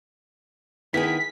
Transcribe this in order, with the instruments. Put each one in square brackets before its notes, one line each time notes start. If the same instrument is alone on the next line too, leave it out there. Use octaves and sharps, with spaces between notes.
[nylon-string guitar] D#3 B3 B4 [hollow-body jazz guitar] E4 G#4 [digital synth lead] B6